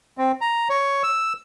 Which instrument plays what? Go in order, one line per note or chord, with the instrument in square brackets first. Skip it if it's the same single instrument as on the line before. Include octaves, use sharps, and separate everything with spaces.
[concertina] C4
A#5
C#5
E6